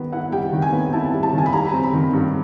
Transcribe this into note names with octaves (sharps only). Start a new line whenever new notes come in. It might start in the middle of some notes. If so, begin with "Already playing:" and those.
Already playing: D#3 G3 B3
E4 F#5
G3 G5
D#3
G#5
B3
E4 A5
G3
A5
D#3
G#5
B5
G3 A#5
C4
B5
D#3
G2